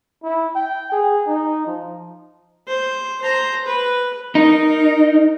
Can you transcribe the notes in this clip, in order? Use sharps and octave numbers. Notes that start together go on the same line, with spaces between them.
E4
G5
G#4
D#4
F3
C5
C5 A#5
B4
D#4 A#4